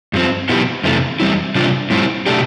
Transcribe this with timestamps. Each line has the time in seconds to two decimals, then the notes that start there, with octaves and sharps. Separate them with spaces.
0.13 G2 F3 C4
0.49 B2 B3 E4 G4
0.84 F2 C3 E3 A3
1.20 E2 C3 G3 C4 E4
1.55 C3 G3 D4 F4
1.90 A2 G3 C4 E4
2.26 B2 A3 D4 G4